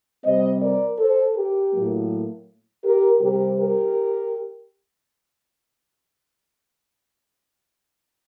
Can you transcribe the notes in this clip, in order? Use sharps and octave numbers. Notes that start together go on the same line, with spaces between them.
C3 G3 C4 C5 D#5
A#4 D5
A4 C5
G4 A#4
A2 F#3 A#3
G4 A#4
C3 G3 C4 G4 A#4
G4 A#4